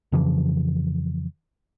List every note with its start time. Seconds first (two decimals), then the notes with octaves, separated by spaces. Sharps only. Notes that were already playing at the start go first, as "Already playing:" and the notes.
0.12 F2 C#3 E3 F3